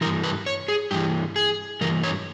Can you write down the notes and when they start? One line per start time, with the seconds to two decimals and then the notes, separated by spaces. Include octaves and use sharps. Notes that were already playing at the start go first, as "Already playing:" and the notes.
0.01 E3 A#4
0.05 G2
0.23 B4
0.46 C#5
0.68 G#4
0.91 G2 E3 G4
1.36 G#4
1.81 G2 E3 A#4
2.03 C#5